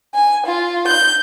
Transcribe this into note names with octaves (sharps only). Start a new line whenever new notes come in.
G#5
F4
G6